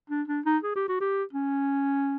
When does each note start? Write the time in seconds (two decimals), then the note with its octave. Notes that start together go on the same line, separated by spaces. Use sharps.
0.10 D4
0.28 D4
0.45 D#4
0.63 G#4
0.75 G4
0.88 F#4
1.00 G4
1.33 C#4